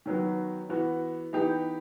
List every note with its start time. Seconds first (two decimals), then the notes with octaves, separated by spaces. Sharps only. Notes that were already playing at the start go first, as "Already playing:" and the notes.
0.06 D#3 F#3 B3 F#4
0.69 E3 B3 F#4
1.33 E3 B3 D#4 G4